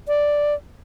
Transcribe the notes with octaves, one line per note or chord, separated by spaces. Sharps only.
D5